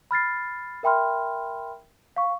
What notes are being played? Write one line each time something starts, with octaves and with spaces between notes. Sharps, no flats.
B5 F6 A6 C7
A#4 E5 G5 B5 C6 F6
F5 C#6